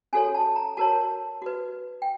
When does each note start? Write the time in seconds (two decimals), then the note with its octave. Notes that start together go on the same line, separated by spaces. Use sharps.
0.13 C#4 F#4 A4 C#5 G#5
0.35 A5
0.56 A#5
0.77 F#4 A#4 C#5 A5
1.42 F#4 B4
2.02 G5